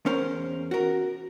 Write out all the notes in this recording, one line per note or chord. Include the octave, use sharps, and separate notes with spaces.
E2 C#4 A#4 C5
F#4 A#4